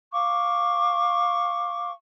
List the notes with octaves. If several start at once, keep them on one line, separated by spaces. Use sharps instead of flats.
F5 C#6 D6